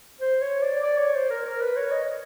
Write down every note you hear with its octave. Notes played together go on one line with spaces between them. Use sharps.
C5
C#5
D5
D5
C#5
C5
A#4
A#4
B4
C#5
D#5